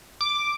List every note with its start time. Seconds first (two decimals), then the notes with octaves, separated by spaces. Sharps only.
0.21 D6